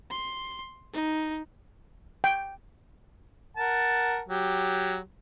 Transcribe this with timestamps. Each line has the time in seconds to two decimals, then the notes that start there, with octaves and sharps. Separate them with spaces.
0.11 C6
0.94 D#4
2.24 G5
3.57 A#4 F#5 A5
4.28 F#3 G4